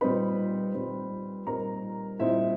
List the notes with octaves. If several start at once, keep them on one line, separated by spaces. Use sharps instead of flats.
A#2 G3 C4 D#4 B4 B5
A#2 G3 C4 D#4
A#2 G3 C4 D#4 A#4 A#5
A#2 G3 C4 D#4 E4 E5